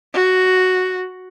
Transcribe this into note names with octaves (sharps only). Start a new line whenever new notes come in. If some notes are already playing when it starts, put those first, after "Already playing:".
F#4